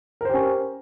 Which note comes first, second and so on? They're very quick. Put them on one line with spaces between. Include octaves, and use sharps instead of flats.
A#4 C5 G4 C#4